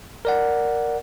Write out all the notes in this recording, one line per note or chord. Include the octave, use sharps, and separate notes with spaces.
A#4 D5 F#5